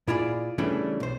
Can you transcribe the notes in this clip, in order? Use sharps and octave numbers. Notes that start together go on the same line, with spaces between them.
A#2 E4 F4 G#4 D5
C#3 E3 G3 A3 C#4 D4
B1 C5